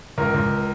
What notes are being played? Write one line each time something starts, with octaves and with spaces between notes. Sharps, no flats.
C#2 A#4
C#2